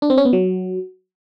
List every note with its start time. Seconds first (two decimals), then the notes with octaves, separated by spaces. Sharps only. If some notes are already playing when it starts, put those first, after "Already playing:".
0.02 D4
0.10 C4
0.18 C#4
0.25 B3
0.33 F#3